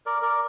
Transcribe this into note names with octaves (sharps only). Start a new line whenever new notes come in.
A#4 D5
A#4 D5